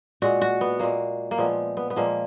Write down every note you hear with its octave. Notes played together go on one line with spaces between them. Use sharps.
A#2 G#3 F#4
F#4
B3
A#2 G#3 A#3
A#3
A#2 F3 G#3 B3
B3
B3
A#2 F3 G#3 A#3